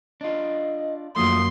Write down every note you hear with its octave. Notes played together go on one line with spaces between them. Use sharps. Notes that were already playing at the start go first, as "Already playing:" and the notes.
D4 F4 D#5
F#2 D#3 F3 A3 A#3 C6 D#6